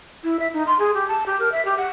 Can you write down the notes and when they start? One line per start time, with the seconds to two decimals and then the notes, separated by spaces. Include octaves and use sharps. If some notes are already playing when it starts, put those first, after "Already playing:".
0.24 E4
0.39 E5
0.54 D#4
0.67 C6
0.79 G#4
0.94 G4
1.08 A5
1.26 G4
1.39 A#4
1.52 E5
1.65 G4
1.78 F#5